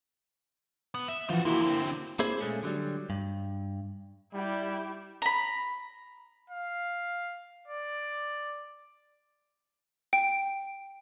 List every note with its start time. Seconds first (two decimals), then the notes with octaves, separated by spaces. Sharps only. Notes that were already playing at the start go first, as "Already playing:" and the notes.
0.95 B3
1.08 E5
1.30 E3 F3 F4 F#4
1.45 E2 C3 A#3 E4 F#4
1.62 D3 C4
2.19 A#3 C4 E4 G#4 C5
2.40 A#2 G#3 A3 C#4
2.63 D3 F#3 G3
3.10 G2
4.33 G3 E4 G4
5.22 A#5 B5
6.50 F5
7.68 D5
10.13 G5